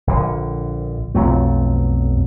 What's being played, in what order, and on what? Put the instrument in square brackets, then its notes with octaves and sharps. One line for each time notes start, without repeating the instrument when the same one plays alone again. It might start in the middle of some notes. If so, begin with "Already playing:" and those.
[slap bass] A#1 D3
[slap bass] B1 F#3 A3 [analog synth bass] F2